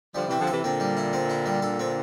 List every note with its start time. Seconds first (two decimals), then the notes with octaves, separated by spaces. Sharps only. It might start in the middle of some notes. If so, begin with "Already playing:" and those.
0.15 D3 F3 G3
0.27 C3 E3 C4
0.39 D3 F3
0.47 C3 E3 A4
0.63 A#2 D3 C4
0.80 G3
0.97 E4
1.13 C4
1.30 E4
1.46 G3
1.62 A#2 D3 A4
1.79 C4